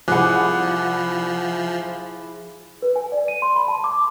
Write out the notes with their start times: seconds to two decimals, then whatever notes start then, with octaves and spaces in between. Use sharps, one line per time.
0.08 C2 F3 E4 G#4 F#5 G#5 D6 F#6
2.82 B4
2.96 G#5
3.12 D5
3.28 D#7
3.42 C6
3.56 B5
3.68 A5
3.84 D6